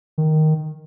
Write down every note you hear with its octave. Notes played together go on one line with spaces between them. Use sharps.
D#3